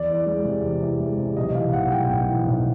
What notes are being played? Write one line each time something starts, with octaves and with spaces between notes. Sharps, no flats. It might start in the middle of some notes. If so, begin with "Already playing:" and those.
Already playing: E2 D5
E3
G#3
C3
E2
E3
G#3
C3
B1 D#5
E3 F5
B1 F#5
A2 G5
B1 G5
E3
B1